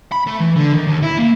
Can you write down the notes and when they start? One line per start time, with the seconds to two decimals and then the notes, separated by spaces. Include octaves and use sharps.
0.12 B5
0.27 A3
0.40 E3
0.56 D3
0.72 D#3
0.87 D#2
1.02 E4
1.19 A#3